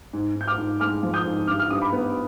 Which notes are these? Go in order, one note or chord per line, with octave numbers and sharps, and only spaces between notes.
G#2
G#2
G6
D6 F6
G#2
G#3 D6 F6
F3
D#6 G6
G#2
G2 D6 F6
F6
G2 D#6
B5 D6
B3